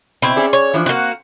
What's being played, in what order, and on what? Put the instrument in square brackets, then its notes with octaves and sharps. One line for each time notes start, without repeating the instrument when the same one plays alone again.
[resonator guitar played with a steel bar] B2 [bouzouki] C4 E4
[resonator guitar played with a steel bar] C#4 G#4 D5
[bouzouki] C#5
[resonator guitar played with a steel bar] E3 F3 D4
[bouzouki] A#3 F#4 [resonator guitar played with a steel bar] C4